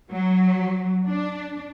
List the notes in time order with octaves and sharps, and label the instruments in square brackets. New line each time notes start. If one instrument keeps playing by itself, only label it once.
[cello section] F#3
D4